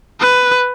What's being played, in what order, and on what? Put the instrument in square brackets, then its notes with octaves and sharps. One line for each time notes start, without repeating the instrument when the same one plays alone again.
[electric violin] B4